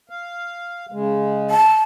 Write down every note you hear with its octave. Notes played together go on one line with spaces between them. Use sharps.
F5
C#3 G#3
A5